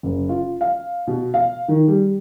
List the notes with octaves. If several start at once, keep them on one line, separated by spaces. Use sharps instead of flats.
F#1
F4
F5
B2
F5
D#3
G3